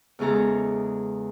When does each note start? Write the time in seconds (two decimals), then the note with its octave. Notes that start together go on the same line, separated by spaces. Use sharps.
0.19 E2 C#3 G#3 G#4 A4 A#5